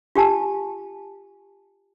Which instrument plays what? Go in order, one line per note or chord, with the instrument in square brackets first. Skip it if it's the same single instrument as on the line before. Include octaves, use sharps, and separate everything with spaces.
[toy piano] F4 G4 G#5 A5